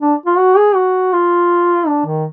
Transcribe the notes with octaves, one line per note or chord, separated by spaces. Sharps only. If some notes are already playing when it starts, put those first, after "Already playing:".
D4
F4
F#4
G#4
F#4
F4
D4
D#3